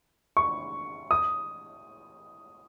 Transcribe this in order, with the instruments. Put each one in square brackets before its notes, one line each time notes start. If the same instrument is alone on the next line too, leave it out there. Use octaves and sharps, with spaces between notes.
[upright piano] C#6
D#6